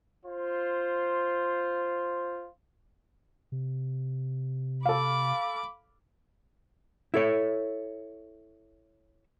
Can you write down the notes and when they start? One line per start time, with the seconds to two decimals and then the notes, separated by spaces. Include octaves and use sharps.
0.24 F4 C5
3.52 C3
4.85 A4 F5 B5 D6
7.14 E4 A4 C#5